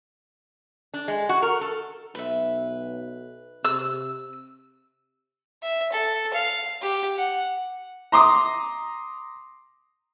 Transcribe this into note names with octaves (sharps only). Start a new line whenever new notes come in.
D4
G#3
F#4
A#4
A4
B1 B4 E5
C3 E6
E5
A4
F5
G4
F#5
A#5 C6 D6 D#6